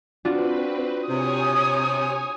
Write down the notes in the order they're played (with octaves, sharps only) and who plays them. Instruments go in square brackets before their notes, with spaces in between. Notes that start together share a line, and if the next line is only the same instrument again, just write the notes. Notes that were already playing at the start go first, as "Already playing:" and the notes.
[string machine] C4 B4 [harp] D4 F4 F#4
[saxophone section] C3 [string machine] C#5 G#5 [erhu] D#6